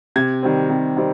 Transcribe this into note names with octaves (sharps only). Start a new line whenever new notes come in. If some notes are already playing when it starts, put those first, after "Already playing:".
C3 G#6
D#3 G3 C4
C3
D#3 G3 C4